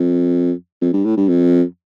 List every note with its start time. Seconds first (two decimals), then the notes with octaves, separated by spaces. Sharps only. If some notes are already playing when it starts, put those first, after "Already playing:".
Already playing: F2
0.81 F2
0.93 G2
1.05 A2
1.17 G2
1.29 F2